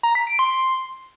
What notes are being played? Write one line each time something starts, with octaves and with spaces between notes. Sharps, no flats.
A#5
B6
D7
C6